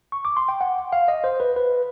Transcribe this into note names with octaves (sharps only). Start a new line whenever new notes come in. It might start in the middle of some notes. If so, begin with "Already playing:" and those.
C#6
D6
C6
G5
F#5
F5
D#5
C5
B4
B4